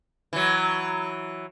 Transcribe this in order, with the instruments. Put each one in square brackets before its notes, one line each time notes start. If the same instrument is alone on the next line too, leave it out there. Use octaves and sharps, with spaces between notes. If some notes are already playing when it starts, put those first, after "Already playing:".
[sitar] E3 F#3